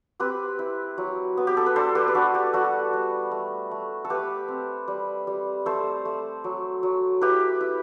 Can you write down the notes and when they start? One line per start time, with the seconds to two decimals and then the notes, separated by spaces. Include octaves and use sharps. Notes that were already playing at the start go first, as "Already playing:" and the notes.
0.20 C4 G4 B4
0.59 E4
0.98 F#3
1.37 B3
1.47 G4
1.57 A4
1.66 B4
1.76 D4 A4 C5
1.95 G4 B4
2.08 B4
2.14 D4 F#4 A4
2.35 G4
2.53 G3 F#4 A4
2.93 G3
3.31 A3
3.71 A3
4.05 A4
4.10 A3 G4 B4
4.48 C4
4.88 G3
5.27 G3
5.66 A3 A4 C5
6.05 A3
6.44 F#3
6.83 F#3
7.21 E4 G4 B4
7.61 E4